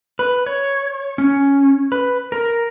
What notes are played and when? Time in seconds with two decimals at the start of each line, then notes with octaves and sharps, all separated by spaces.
0.19 B4
0.46 C#5
1.18 C#4
1.92 B4
2.32 A#4